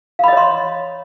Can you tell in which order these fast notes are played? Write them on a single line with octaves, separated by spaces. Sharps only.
F5 B5 D#5 C#5 C6